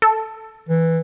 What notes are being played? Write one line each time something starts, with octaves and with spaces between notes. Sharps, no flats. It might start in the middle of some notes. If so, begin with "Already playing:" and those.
A4
E3